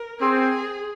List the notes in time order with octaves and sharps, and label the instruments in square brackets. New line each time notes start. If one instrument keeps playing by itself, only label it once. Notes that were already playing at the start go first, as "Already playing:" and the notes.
Already playing: [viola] A#4
[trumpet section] C4 [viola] G#4